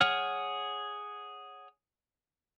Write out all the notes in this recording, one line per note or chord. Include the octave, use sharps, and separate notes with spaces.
G#4 C#5 F#5 F6